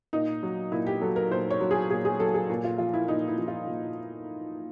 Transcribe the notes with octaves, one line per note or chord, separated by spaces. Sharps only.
A#2 D#4
F#3
A#2 E4
G4
F#3 A4
A#4
A#2 C5
C#5
F#3
G#4
A#2 G#4
G#4
F#3 A4
G#4
A#2
F4
F3 F4
E4
A#2 D#4
E4
F3
F4
A#2